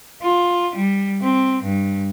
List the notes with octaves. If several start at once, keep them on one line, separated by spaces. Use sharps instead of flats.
F4
G3
C4
G2